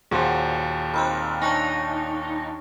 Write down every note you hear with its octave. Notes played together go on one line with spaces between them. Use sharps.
D#2 A#2 F#3 G#4 C5 G#5 B5
C4 D#4 A#4 B5 E6 F#6
D4 D#4 C#5 G#5 C#6 F#6